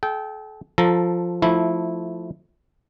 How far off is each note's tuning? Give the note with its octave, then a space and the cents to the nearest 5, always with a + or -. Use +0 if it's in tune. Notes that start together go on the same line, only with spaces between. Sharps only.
A4 -40 G5 -15
F3 +5 A4 +10 A#5 +10
F3 +5 A3 +0 E4 -10